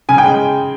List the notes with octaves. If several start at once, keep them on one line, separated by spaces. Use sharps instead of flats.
C#3 G#5
G5
G#3